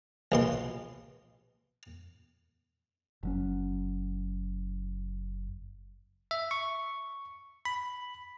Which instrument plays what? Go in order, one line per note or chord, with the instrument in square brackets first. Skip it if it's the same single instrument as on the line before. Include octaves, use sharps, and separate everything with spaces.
[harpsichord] A#1 B2 C6
[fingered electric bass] F#1 F#3 C#4
[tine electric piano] E5
C#6
B5